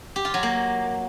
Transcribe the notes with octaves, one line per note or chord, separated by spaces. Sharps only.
G4
F4
F#3
A#3